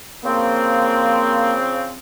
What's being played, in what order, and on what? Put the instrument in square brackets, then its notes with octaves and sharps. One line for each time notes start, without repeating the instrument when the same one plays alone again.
[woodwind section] C#3 F3 C4 [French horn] A#3